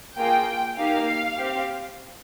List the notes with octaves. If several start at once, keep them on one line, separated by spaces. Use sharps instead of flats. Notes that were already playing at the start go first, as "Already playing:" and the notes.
A#3 F4 G#4 G5
A#3 D#4 G4 F5
C4 G4